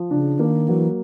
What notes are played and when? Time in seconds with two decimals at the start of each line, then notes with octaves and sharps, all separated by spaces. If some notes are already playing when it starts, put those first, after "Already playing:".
Already playing: F3
0.10 C#3 D4
0.39 D#3 A#3
0.68 E3 F#3